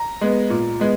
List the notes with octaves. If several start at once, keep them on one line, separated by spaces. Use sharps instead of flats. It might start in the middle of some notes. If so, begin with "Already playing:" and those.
Already playing: A#5
G#3 B3
A#2
G#3 B3